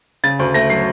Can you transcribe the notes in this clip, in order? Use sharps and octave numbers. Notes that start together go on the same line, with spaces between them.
C#3 A6
D2
A3 A#6
F#3 C7